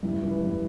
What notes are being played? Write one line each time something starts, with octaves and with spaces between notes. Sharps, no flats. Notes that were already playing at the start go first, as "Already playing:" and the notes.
G2 E4
E3
G2